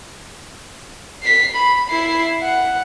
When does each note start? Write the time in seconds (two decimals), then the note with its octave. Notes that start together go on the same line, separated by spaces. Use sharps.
1.23 B6 C7
1.55 B5
1.90 E4 C7
2.42 F#5